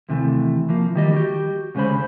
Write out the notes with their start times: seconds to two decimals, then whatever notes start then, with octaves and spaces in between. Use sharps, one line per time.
0.09 D#2 C3 E3 A3
0.69 E3 F3 A#3
0.95 D#3 G3 D#5
1.13 F#4 G4
1.75 D2 C#3 G#3 C#4 C5 B5